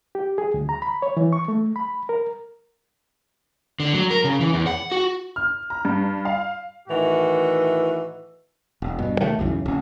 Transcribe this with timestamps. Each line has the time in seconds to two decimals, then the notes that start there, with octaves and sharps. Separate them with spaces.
0.15 G4
0.38 G#4
0.54 D2
0.69 A#5
0.82 B5
1.02 C#5
1.17 E3
1.33 C#6
1.48 A3
1.76 B5
2.09 A#4
3.80 D3
3.95 F#3
4.10 A#4
4.24 C#3
4.40 E3
4.53 E2
4.67 F#5
4.92 F#4
5.36 F6
5.70 A#5
5.85 G2
6.25 F5
6.88 A2 D#3 E3 F#4
8.82 E1
8.99 G2 B2
9.19 C3 D#3 G3 A3
9.39 B1 F#2 C#3 E3
9.66 D1 C#4